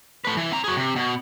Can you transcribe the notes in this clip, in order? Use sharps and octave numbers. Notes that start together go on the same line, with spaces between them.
A3 B4
E3
C4 A#5
F#4 G#4
C3
B2